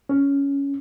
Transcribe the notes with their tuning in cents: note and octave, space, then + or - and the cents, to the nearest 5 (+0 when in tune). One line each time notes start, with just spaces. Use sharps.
C#4 +10